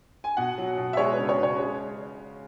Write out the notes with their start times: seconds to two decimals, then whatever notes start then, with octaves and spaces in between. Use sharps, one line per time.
0.24 G#5
0.37 B2 F#5
0.58 F#3
0.77 B2
0.93 E5
0.97 G#3 C#5
1.13 B4
1.18 C#3
1.29 C#5
1.39 C#3 C#5
1.59 G#3